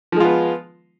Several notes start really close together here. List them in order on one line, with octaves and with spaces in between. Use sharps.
F3 G#3 F4 B3